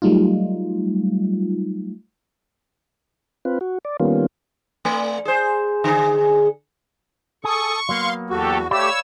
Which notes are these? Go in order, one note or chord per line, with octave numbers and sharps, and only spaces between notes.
F#3 G3 A3 D#4 F4
C4 F4 B4
F#4
D5
D#3 G3 A#3 B3 C#4 F4
A3
G#4 C5
D3 G#4
G#4 A4 C#6 D#6
F#3 A#3 B3 F5 C6
E2 F#4 G4 A4
A3 G4 C#5 D5 F5 B5 E6